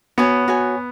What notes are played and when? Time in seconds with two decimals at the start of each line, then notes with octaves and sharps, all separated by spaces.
0.18 B3 F#4 C#5 G#5
0.48 F#4 C#5 G#5